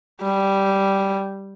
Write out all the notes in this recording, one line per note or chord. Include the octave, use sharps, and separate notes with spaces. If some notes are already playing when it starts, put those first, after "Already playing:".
G3